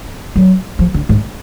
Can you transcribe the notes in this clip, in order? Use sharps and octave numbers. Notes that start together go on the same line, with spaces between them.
F#3
F3
D3
G#2